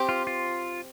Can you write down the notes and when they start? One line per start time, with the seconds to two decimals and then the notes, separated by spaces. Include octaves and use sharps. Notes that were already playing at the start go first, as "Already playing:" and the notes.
Already playing: C4 G4 C5
0.09 F4
0.27 F4